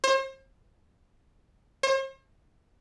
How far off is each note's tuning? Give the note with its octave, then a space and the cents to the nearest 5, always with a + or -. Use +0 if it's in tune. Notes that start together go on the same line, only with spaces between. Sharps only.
C5 +40
C5 +45